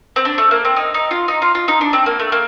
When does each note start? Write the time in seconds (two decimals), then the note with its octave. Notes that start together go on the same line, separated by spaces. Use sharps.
0.16 C4
0.25 D4
0.38 A3
0.51 A#3
0.65 C4
0.76 D#4
0.94 D#4
1.11 F4
1.28 D#4
1.42 F4
1.55 F4
1.68 D#4
1.81 D4
1.93 C4
2.06 A#3
2.19 A3
2.32 A#3